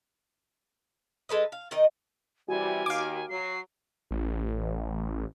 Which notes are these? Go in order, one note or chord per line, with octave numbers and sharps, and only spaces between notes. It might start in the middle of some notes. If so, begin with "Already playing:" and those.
G#3 A4 B4 D#5
F5
D#3 D#4 D5 D#5
C3 E3 G3 F#4 G#5
D#2 D#3 F5 D6
F#3 C7
A1